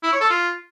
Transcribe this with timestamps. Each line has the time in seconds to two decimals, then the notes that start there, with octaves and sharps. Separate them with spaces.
0.03 E4
0.12 C#5
0.21 A4
0.30 F4